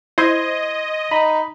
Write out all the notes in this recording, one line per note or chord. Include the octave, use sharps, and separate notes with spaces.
E4 C5 D#5 C6 G#6
D#4 B5